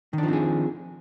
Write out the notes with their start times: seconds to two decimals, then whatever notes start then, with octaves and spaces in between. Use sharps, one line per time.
0.13 D#3
0.18 D4
0.23 F3
0.28 C4
0.33 G#4